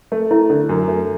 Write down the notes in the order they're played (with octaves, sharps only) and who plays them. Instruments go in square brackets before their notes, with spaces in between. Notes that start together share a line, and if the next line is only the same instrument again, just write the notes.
[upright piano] A3
[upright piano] A3 [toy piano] E4
[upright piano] D3
F#2
A3